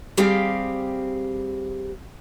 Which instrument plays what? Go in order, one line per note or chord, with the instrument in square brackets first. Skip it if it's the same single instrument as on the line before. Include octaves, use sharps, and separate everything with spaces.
[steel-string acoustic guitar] G3 C4 G4 G#4 F5 G5